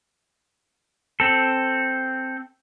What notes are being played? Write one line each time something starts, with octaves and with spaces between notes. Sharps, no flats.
C4 A4